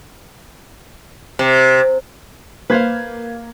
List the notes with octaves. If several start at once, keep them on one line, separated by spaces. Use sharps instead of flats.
C3
A#3 B4 C5 F5 G#6